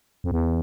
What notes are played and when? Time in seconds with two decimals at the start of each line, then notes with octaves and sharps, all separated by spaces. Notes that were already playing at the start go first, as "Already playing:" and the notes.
0.24 F2
0.32 E2